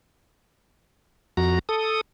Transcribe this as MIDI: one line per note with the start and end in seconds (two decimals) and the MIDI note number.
1.37 1.59 41
1.37 1.59 66
1.37 1.59 82
1.69 2.01 69
1.69 2.01 87